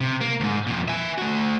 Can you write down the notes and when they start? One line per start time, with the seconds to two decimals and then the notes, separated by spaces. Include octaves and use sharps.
0.01 C3
0.21 A#3
0.40 D2 G#2
0.67 F2 A#2
0.88 E5 G#5
1.18 A3 F#4